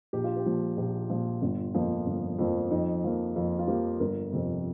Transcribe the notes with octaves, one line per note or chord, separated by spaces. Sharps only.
A#1 G4
F4
G4
A#2 F3
A#1 G4
A#2 F3 F4
G1
F2 F3 A#3
G1
F2 F3 A#3
F2 D#4
F3 A#3
F2 F4
F4
F3 A#3 G4
G1 A#4
F2 C3